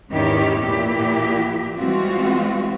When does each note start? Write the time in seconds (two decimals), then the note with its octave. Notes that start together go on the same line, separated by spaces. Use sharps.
0.11 E2 G#2 D#3 C#4 E4 G4
0.61 A#2 E3 A#3 E4 G4
1.78 E3 G3 G#3 C4 F4 F#4